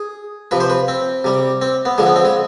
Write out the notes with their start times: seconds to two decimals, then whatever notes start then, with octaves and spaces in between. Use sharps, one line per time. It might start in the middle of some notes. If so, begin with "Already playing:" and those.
Already playing: G#4
0.51 C3 F3 B4
0.60 C5
0.70 B4
0.88 C4
1.24 C3 G3
1.62 C4
1.85 B3
1.98 D3 F3 G#3
2.07 B3
2.16 C4
2.25 G#3